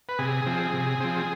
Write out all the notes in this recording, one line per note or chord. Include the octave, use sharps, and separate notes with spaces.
B4
C3 G#4
F3 C4
C3
F3 C4